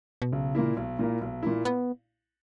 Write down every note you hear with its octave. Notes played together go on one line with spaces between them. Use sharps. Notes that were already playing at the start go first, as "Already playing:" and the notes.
B2
B1 C#3
A#2 A#3 E4
B1
A#2 A#3 E4
B1
A#2 A#3 E4
B3